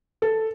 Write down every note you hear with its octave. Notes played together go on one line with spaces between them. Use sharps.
A4